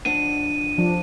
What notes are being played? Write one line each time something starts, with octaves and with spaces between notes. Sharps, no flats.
F2 D4 F#5 D#7
F3 D4